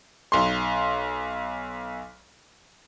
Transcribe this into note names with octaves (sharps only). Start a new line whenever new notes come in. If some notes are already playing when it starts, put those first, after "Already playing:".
B1 C6